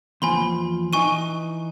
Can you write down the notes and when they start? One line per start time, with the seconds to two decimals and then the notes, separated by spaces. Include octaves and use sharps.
0.22 E2 A#2 F3 G#5 B5 C6
0.93 E3 D#4 G#5 C#6 D#7